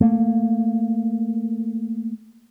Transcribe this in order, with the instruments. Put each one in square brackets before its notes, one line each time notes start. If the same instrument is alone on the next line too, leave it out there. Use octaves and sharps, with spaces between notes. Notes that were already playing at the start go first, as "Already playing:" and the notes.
[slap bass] A3 A#3